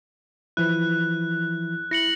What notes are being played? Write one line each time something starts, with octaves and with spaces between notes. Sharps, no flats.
E3 F3 E4 F#6
E4 A#6 C#7 F#7